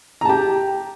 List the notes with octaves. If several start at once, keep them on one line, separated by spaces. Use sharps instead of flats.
G4 A5 A#5